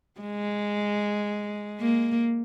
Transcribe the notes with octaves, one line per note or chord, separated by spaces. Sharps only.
G#3
A#3